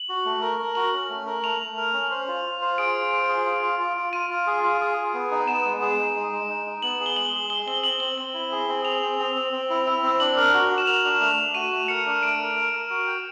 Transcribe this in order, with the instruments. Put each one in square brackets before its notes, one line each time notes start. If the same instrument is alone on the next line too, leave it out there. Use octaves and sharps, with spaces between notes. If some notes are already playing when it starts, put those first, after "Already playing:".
Already playing: [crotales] F#7
[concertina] F#4
A3
A#4
A#4
[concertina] F#4 [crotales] F#7
[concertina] C#4
A3
A#4
[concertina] A3 [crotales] F7
[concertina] A3
A#4
C#4
C5
F4
F4
C5
[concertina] G#4 [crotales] D7
[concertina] F4
C5
G#4
F4
F4
F4
F4
[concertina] F4 [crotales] D#7
[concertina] F4
G#4
F4
G#4
G#4
B3
D#4
[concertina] B3 [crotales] E7
[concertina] G#3
G#4
D#4
G#3
G#3
D#4
D#4
[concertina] B3 [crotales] F#7
[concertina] G#4
[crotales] G7
[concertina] G#3 [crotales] F#7
[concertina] G#4
[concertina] G#4 [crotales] G7
[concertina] C4 [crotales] G7
[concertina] C4 [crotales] F#7
[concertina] C4 [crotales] G7
[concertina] C4 [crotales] F#7
[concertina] E4
G#4
C4
[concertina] G#4 [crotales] F7
[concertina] C4
C4
C4
C4
E4
E4
C4
[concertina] D4 [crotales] F#7
[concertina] A#4
F#4
F#4
[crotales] E7
[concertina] A#4 [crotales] F7
[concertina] D4
A3
A3
[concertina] F#4 [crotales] D#7
[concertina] A3
[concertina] A#4 [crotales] C#7
[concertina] D4
[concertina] A3 [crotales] D7
[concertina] A#4
A#4
A#4
F#4
G5